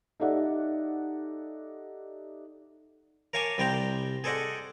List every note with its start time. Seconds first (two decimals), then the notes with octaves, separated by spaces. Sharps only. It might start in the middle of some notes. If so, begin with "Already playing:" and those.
0.20 D#4 G4 A4 D5 E5 F#5
3.33 A#4 C#5 F5 G#5 A5 D6
3.58 C2 G3 G4 C5 G5 A#5
4.24 G#4 A4 C5 D5 D#5 F#5